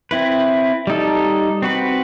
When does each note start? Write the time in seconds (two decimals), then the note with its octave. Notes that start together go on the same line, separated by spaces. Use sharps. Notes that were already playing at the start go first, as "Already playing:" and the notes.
0.11 C4 E4 B4
0.87 G3 D#4 A4
1.62 C4 F#4 B4